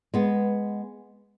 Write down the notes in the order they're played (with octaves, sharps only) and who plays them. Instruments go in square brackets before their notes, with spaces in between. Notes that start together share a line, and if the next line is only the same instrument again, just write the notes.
[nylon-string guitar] G#3 B3